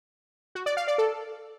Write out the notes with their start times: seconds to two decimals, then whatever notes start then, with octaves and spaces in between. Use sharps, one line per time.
0.55 F#4
0.66 D5
0.77 F5
0.88 D5
0.98 A4